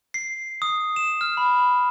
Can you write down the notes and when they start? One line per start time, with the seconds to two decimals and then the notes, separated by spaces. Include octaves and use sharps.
0.14 C7
0.62 D#6
0.96 E7
1.21 F6
1.37 B5